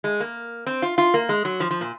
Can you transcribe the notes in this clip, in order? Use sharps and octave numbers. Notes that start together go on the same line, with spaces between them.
G#3
A#3
C4
F4
F4
A#3
G#3
F#3
F3
F3
A#2